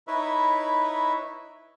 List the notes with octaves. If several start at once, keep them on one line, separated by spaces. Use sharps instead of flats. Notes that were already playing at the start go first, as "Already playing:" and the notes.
D#4 E4 B4 C#5 E5